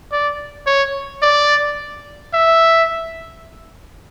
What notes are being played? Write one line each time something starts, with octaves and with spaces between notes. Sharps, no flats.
D5
C#5
D5
E5